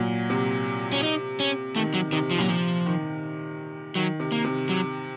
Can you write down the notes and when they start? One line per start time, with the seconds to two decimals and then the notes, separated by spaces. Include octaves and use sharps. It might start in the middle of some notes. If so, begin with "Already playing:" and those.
Already playing: A#2 F#3
0.30 C3
0.93 C#4
1.03 D#4
1.40 C#4
1.76 D#3 A3
1.94 F#3
2.12 C3 D#3
2.31 F3
2.38 A#2 F#3
2.49 C3 F3
2.86 D#3
3.95 D#3 F#3
4.20 C3
4.32 A#3
4.45 C3
4.69 F#3